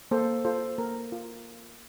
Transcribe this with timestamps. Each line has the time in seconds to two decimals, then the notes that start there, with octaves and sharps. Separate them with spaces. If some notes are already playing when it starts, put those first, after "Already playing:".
0.11 A#3 A4 C5
0.45 F4 A4 C5
0.78 A#3 A#4
1.12 F4